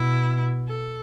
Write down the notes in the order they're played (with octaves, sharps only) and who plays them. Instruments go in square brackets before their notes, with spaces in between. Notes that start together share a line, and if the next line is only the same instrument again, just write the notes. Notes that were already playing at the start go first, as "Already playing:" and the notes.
Already playing: [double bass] B2 [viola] E4
[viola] A4